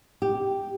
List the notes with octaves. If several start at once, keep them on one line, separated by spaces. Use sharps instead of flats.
G4